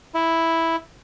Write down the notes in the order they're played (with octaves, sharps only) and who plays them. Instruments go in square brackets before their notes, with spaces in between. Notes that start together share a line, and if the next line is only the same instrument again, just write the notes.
[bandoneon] E4